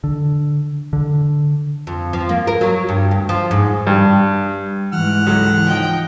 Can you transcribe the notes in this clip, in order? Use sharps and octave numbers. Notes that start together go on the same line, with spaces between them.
D3
D3
F2
F3
A#3
A#4
F#3
G2
D2
F3
G#2
G2
G#2 E3 F#5 F6
C#2 F#3 A4
F3 D#4 G5 G6